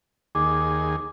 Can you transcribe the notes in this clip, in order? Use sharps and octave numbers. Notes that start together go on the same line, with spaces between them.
D#2 G#4 D6